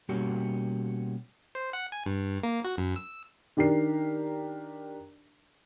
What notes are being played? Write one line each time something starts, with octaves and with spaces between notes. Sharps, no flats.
B2 G3 A#3 C#4 F#4 G4
C5
F#5
G#5
G2
A#3
F#4
F#2
E6
D#3 D4 G4 A#4 C7